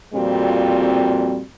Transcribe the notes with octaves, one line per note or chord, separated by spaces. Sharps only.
F2 A#2 G3 C4 F#4